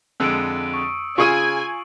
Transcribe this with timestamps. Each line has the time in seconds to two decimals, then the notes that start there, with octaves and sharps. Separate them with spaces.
0.20 F2 D3 G#3 E6 C#7 D7
0.74 C#6 D#6
1.18 C#3 F4 G#4 G#5 C#6 D#7 E7 F#7